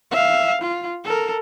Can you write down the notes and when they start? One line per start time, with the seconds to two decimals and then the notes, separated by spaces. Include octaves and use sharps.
0.11 E5 F5
0.62 F4
1.04 A4 A#4